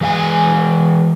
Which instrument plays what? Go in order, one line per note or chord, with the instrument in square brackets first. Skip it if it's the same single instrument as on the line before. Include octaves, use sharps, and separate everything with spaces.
[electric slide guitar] E3 G#3 E5 G#5